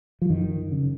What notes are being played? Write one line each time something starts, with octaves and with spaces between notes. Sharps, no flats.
F3
F#2 D#3
C#3